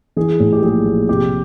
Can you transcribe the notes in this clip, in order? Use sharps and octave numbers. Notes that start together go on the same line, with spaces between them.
E3 G#4
A2
G4
A#1 G#4
A#1
C3 G4